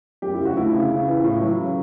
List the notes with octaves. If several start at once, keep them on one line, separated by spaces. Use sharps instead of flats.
F#2 G4
E4
C#3
F#4
D2 E4
C#3
C#3
E3
A2
F#3
C#3